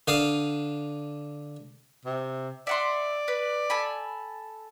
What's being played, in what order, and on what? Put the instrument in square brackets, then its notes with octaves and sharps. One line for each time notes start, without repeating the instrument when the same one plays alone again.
[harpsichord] D3 F5 D#6
[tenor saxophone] C3
[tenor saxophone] D5 [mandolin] E5 F#5 C6
[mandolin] B4
A4 G#5 B5